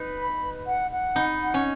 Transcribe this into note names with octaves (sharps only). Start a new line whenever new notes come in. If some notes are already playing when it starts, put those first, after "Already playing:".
Already playing: D#4 B4
B5
B4
F#5
F#5
D#4 B5
F#5
C#4